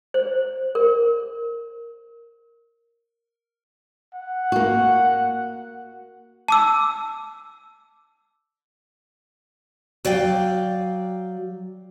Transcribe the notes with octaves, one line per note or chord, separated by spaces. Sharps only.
C5
A#4
F#5
A#3 F#4
A5 D6 E6
F#3 D5 F5 G5